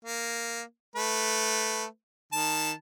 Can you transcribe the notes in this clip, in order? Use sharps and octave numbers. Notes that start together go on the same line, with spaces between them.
A#3
A3 B4
D#3 A5